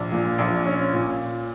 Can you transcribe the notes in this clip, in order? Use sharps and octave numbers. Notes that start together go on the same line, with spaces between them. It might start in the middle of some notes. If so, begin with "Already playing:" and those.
Already playing: A#1
A#2
A#1
C#4
A#2